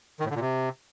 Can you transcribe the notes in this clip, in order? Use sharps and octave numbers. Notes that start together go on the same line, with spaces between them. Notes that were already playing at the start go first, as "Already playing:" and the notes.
D#3
A2
D3
A#2
C3